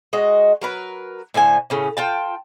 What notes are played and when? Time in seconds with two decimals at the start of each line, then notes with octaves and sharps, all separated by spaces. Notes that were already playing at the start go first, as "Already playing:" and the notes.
0.13 G#3 F#4 D#5
0.61 F#3 A#4 B4
1.34 A2 D3 C5 G#5
1.70 A2 C#3 C#4
1.97 F4 G5 A5